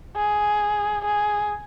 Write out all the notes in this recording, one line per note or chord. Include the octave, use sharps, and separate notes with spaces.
G#4
G#4